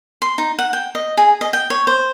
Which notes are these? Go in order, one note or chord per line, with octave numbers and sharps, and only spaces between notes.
C6
D#4
F#5
G5
D#5
G#4
D#5
G5
C#5
C5